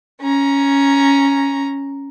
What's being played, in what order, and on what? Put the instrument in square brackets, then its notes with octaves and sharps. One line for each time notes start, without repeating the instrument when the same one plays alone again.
[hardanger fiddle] C#4 A#5